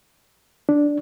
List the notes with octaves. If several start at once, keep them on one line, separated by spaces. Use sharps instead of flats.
D4